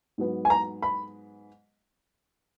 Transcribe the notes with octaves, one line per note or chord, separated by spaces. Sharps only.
G#2 F#3 B3
G#5
A#5
B5